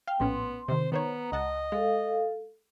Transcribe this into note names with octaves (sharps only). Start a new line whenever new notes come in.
F5 G5 F6
A#1 A2 B3 C#4 C6
C3 D#3 C5
D#3 B3 C5 C#5 A#5
C#2 D#5 F#5 A5
G#3 A4 F5